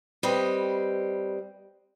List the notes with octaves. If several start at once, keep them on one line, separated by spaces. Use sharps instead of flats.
G3 C4 B4 D#5